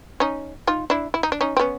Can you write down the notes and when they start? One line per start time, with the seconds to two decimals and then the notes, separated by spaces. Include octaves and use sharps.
0.20 C#4 D#4
0.67 D#4 F4
0.90 D4 E4
1.14 E4
1.23 D#4
1.32 D4
1.41 C#4 D#4
1.57 C4
1.59 B3 C#4